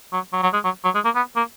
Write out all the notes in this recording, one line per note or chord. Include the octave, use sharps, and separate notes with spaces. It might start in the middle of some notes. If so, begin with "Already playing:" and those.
F#3
F#3
F#3
G#3
F#3
F#3
G#3
A#3
B3
A#3